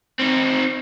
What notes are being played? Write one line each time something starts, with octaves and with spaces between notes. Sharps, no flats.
C4 D#4